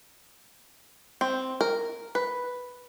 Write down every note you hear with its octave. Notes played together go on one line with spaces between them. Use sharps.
C4
A#4
B4